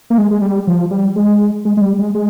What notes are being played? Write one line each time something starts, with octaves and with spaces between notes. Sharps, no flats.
A#3
G#3
G#3
G3
F3
G3
G#3
G#3
G#3
G3
G#3
G#3